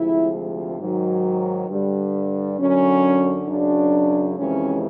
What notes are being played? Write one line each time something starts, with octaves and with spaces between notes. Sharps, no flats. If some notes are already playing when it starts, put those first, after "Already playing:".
Already playing: D2 C3 F3 G#3 E4
G#2 D#3 F#3
G2 D3 G3
F#2 D3 F#3 C#4
F#2 C#3 F#3 D4
F2 C3 E3 G#3 C#4